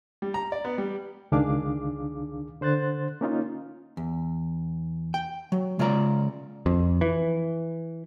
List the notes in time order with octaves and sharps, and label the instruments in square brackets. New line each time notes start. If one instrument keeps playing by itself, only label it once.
[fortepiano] G3
A#5
D5
B3
G3
[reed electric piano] C#2 D#3 D4 G#4 F5 D6
D3 C5 F#6 A6
A#3 C#4 D#4 F4
[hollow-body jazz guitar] E2
G5
F#3
C#3 G#3 F4 C#5 D5 A#5
[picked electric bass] F2
E3